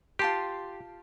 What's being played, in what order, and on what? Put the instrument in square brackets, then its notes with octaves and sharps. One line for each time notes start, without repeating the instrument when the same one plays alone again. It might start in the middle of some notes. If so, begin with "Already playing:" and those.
[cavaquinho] F4 A5 C6 [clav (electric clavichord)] G4